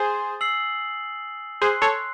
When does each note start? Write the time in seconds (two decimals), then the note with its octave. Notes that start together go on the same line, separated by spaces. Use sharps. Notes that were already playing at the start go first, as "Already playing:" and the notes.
Already playing: G#4 C5 G#5 D#6 A6
0.41 E6 C7 F#7
1.62 G#4 C5 C6 F#6 C7
1.82 A4 C#5